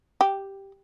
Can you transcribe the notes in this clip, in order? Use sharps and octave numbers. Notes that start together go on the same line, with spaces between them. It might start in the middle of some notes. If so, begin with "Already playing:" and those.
G4